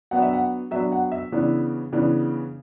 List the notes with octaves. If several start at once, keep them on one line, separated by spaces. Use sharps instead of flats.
F#3 B3 D4 F#5
E5
F#5
F#3 B3 D4 E5
F#5
E5
C#3 E3 B3 D4
C#3 E3 B3 D4